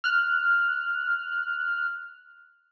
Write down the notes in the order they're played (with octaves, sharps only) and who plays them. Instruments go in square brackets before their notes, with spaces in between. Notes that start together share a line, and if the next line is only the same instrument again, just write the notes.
[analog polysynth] F6 F#6